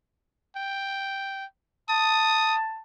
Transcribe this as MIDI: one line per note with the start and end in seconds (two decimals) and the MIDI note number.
0.56 1.45 79
1.89 2.81 81
1.89 2.55 87